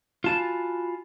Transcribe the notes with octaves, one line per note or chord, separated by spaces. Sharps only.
F4 F#4 G#5 A5 B5